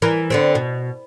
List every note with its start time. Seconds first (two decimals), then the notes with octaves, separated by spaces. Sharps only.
0.02 E3 A#4
0.30 D3 B3 C4
0.55 B2